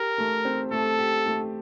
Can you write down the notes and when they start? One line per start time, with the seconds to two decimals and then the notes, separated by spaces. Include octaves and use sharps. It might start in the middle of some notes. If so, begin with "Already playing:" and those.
Already playing: G4 A#4
0.18 A3
0.45 C4
0.71 A3 A4
0.99 G4
1.26 A3